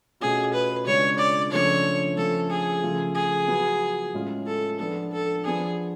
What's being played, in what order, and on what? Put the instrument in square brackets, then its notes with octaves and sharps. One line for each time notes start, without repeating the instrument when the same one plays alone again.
[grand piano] B2 A3 C#4 F4 [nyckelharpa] G#4
[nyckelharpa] B4
[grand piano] C#3 G#3 D4 F4 [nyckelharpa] C#5
[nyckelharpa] D5
[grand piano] C#3 F3 A3 D4 [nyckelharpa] C#5
[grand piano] F3 A3 C#4 F4 [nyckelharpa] A4
[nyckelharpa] G#4
[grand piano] C#3 F3 A3 F4
[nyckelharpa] G#4
[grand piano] F#3 B3 F4
A2 G#3 C#4 F4
[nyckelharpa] A4
[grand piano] F3 B3 D4 [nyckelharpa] A4
[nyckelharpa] A4
[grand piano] F3 B3 D4 [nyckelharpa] G#4